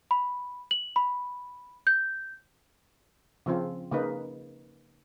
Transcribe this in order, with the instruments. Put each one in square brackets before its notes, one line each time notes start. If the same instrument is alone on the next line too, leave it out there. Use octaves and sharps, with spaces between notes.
[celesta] B5
F#7
B5
G6
[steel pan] C#3 F3 C4 F4
C#3 A#3 D#4 B4